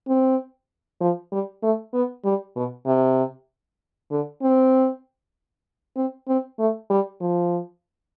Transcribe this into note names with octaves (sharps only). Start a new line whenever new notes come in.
C4
F3
G3
A3
B3
G3
B2
C3
D3
C4
C4
C4
A3
G3
F3